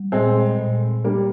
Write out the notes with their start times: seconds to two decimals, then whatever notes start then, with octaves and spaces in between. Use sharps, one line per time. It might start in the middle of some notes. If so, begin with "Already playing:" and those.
Already playing: G3
0.12 A#2 G#3 C4
0.58 A#2
1.04 G3 A#3 D4